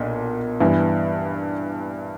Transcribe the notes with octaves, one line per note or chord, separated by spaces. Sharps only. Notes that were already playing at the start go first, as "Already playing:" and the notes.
Already playing: B1 A#2 D4
G2 E3 B3 E4